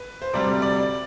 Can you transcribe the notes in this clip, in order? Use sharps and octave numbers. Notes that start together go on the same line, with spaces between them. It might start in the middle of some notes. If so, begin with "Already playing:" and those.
Already playing: B4
C5
D2 C3 G3 D5
D5